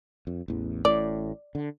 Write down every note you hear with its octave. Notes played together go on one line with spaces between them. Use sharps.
F2
A1 E2
A1 A2 D5
D3